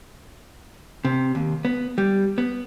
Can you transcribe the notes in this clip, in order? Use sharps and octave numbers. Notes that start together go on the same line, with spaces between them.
C3
D#2
B3
G3
B3